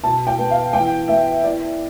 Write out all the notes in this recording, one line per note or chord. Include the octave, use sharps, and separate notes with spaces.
B2 A5
G5
B3
F5
E3 G5
B3 E5
E4 D5